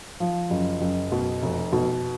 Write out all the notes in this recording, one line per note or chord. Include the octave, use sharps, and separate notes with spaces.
F3
F#1
F#1
B2
F1
B2